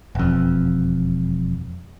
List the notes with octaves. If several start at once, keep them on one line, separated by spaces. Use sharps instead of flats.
E1 F2